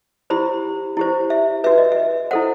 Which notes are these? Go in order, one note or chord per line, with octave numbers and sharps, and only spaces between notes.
E4 G4 C5 B5
E4 G4 C5
E5
F#4 B4 E5
D#5
E5
E4 A4 C5 F#5